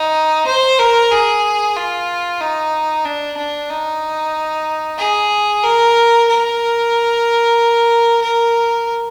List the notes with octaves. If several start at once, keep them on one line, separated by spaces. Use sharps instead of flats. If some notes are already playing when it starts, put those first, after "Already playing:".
Already playing: D#4
C5
A#4
G#4
F4
D#4
D4
D4
D#4
G#4
A#4
A#4
A#4